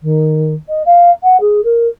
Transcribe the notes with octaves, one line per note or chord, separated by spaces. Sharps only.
D#3
D#5
F5
F#5
G#4
A#4